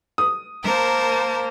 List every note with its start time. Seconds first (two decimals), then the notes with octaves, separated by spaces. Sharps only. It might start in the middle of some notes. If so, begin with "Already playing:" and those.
0.18 D#6
0.63 A#3 A#4 C5 A5